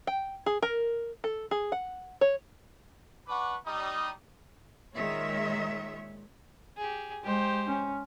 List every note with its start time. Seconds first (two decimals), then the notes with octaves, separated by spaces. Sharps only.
0.07 G5
0.46 G#4
0.62 A#4
1.24 A4
1.51 G#4
1.72 F#5
2.21 C#5
3.28 D4 B4 F#5 B5 C#6 D6
3.66 G3 D#4 D#6
4.95 A#2 D#3 G#3 C#5 E5
6.77 G4 G#4
7.23 G#3 G4 C5
7.67 C#4